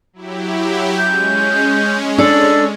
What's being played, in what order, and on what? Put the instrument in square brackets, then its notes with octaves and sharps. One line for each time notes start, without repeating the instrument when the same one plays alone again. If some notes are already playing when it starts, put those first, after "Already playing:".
[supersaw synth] F#3 E4 G4
[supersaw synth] G#3 C#4 [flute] G6
[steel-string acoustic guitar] D4 A4 [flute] E6